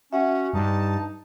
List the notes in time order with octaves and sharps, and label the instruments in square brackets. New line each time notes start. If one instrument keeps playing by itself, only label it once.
[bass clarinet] C#4 [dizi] F#4 [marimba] E5 F#5
[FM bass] G2 [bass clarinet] D#4 [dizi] A5